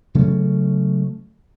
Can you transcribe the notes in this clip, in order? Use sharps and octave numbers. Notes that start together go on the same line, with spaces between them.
C#3 F#3 A3 C#4